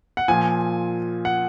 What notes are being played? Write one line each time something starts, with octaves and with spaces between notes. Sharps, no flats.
F#5
A#2 F3 G#5
F#5